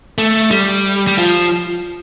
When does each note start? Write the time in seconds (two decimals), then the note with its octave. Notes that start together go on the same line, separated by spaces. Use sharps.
0.18 A3
0.51 G3
1.07 G3
1.18 F3